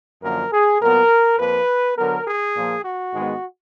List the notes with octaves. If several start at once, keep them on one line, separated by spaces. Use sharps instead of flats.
F#2 D3 F3 A#3 A#4
G#4
A#2 F#3 B3 A#4
F2 F3 A#3 B4
D3 F#3 B3 A#4
G#4
A#2 F3 A#3
F#4
G#2 D#3 G#3 B3